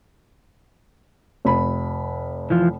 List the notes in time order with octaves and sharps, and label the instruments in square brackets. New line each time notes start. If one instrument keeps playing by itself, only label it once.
[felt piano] F1 B5
[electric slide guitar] E3 F3 F4